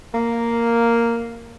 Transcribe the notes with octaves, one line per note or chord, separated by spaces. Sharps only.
A#3